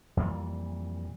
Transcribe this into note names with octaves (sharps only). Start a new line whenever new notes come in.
F2 A#2 E3 G3